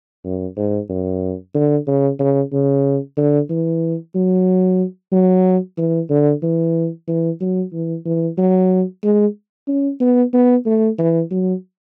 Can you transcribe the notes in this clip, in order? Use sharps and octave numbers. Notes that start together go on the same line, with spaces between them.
F#2
G#2
F#2
D3
C#3
C#3
C#3
D3
E3
F#3
F#3
E3
D3
E3
E3
F#3
E3
E3
F#3
G#3
C#4
B3
B3
A3
E3
F#3